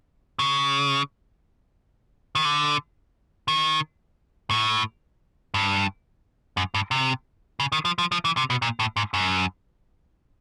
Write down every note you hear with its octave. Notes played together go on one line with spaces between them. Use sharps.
C#3
D#3
D3
D#3
A2
G2
F#2
G2
C3
C#3
D#3
F3
F3
F3
E3
C3
B2
A#2
A2
G#2
F#2